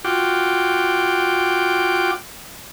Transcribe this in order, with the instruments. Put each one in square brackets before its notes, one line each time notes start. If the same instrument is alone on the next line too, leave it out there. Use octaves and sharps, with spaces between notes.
[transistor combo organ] F4 F#4 G5 D6